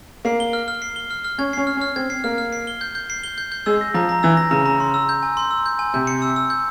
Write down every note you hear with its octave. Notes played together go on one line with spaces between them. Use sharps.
A#3 C7
G7
F6
F6
C7
G7
F6
F6
C#4 G#6
C#4 C7
F6
C#4
F6
C4 G#6
C7
A#3 F6
F6
C7
G7
G6
G6
C7
G7
G6
G6
G#3 E6
A#6
F3 A#5
A#5
E3 E6
A#6
C#3 A#5
A#5
C6
E6
G6
G#5
C6
E6
G6
G#5
C3 G6
C#7
E6
E6
G6